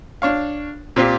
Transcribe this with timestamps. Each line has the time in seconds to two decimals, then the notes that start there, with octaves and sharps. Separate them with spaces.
0.22 D4 C#5 F5
0.96 A#2 C4 F4 G4